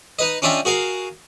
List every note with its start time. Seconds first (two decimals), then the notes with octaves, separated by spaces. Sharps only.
0.19 D#4 B4 D#5
0.42 C#4 D4 F4 D#5 E5 G5
0.65 F#4 G#4 A#4 F5